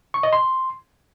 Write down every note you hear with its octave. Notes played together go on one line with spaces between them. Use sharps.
C#6
D#5
C6